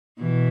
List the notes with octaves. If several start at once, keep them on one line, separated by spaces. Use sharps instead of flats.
B2 E3